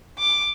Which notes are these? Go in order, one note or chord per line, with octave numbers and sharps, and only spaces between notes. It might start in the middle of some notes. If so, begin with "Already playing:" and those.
D6